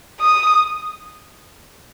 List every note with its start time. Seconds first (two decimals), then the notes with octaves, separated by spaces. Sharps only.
0.21 D#6